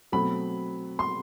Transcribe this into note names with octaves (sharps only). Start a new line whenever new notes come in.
B2 F#3 A3 C4 B5
C6